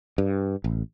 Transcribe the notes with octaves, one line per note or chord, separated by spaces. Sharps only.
G2
A1